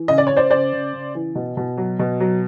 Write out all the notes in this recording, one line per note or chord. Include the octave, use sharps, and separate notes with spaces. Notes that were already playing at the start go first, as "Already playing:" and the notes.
Already playing: E3
C#3 D#5
D5
C#3 C#5
C5 D5
C#3 C5 D5
C#3
C#3
E3
B2
B2
F#3
B2
F#3